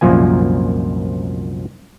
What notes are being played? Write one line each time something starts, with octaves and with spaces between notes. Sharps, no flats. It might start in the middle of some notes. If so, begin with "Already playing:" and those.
C2 F#2 A#2 F3 A#3 G#5